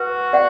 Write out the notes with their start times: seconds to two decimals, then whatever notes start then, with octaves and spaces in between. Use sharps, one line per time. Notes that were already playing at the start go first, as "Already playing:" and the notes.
Already playing: F#4 B4
0.33 D5 F#5